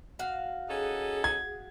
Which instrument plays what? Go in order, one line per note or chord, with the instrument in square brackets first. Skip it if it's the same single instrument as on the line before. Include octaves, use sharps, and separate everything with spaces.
[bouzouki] F#4 F5
[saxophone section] C#4 D#4 A4 [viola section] G#4
[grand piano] G#6